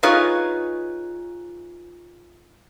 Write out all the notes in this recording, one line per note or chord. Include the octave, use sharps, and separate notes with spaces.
D#4 F4 G#4 B4 C#5 D#5